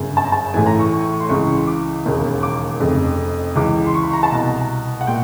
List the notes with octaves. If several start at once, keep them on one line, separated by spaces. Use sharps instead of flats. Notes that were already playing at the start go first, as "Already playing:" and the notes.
Already playing: G1 F#2 C#3
A5
A#5
A5
A1 A2 E3 G#5
A#5
C#6
C#6
C6
C#2 C#3 E3 C#6
D6
E1 D#2 C#3
D6
F1 F2 C#3
C#2 C#3 E3 D6
C6
C#6
B5
A#5
A5
C2 B2 A#5
F#5
A#2 G5